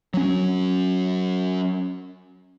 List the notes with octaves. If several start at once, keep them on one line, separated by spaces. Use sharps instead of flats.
F#3 C#4